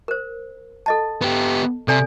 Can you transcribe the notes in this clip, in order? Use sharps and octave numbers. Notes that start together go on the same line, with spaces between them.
A#4 C5
A4 D#5 A5
B3 G4
C3 A4 D5 G#5